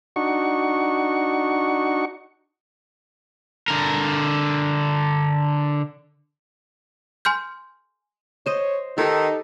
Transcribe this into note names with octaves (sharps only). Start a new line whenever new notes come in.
D4 D#4 F#4 C#6
D3 A#4
G#5 C6 F6 G6
C5 C#5 D#5
D#3 D#4 G4 A4